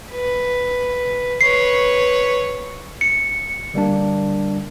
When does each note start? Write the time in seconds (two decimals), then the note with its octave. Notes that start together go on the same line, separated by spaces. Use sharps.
0.11 B4
1.41 B4 C#5 C7
3.01 C#7
3.74 D3 G3 A#3 D4